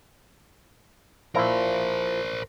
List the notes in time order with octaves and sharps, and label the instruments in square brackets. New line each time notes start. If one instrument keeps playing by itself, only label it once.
[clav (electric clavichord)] A#2 F3 E4 [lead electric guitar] A#4 C5